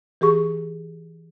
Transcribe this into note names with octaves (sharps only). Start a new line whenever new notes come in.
E3 G4 G#4 C#6